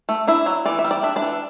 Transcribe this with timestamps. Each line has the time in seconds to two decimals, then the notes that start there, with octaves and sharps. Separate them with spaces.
0.09 A3
0.27 D4 E4 E5
0.46 F#3
0.66 E3 D5
0.79 E5
0.85 G3
0.91 D5
1.03 D4 E5
1.16 D4 D5
1.22 E3